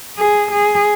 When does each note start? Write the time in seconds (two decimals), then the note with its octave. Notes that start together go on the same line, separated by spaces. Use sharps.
0.18 G#4
0.51 G#4